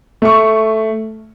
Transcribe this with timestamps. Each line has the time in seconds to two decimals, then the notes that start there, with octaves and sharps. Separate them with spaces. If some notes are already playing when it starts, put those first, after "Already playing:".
0.22 A3 C#6